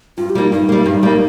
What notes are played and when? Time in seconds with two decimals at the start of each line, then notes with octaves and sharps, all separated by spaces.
0.17 G2 F4
0.30 G4
0.35 G3 A#3 D#4
0.52 G2 D#4
0.69 G3 A#3
0.86 G2
1.03 G3 A#3